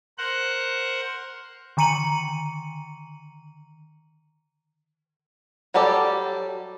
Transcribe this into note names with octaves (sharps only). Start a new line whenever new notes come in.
A#4 C5 F#5 F#6
D3 D#3 A#5 C#7 D#7 F#7
F#3 G3 G4 A4 D5